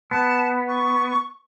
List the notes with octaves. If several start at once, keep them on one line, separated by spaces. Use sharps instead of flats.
B3 A5
C#6